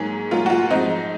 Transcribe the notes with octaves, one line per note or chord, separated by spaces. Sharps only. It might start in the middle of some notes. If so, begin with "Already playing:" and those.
Already playing: G#2 F#3 A#3 G#4
G#2 F#3 A#3 F4
F#4
F4
G#2 F3 C4 D#4